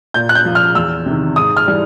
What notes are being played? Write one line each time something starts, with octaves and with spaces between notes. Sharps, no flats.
A#2 G6
F#6
G6
F3
F6
E2 E6
C3 D#3
G#2 D#6
F6
E3 G3